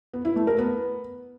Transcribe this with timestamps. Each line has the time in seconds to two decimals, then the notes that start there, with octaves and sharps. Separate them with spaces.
0.13 B3
0.25 E4
0.36 A3
0.47 A#4
0.58 B3